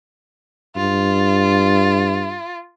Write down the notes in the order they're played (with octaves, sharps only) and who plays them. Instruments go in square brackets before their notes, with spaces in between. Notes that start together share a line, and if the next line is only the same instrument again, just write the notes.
[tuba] G2 [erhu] F4